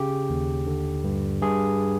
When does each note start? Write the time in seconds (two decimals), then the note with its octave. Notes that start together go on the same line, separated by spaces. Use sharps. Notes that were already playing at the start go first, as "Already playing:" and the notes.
Already playing: C#3 G4
0.30 D#2
0.67 D3
1.04 G2
1.42 G2 G#4